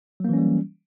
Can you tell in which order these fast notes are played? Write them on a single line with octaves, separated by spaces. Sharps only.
F#3 A#3 E3 C#4 G3